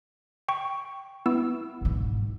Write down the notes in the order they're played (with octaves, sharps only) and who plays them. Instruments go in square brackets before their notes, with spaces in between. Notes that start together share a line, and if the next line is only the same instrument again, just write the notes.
[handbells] G5 C#6
B3 E4 E6
[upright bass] B1 G#2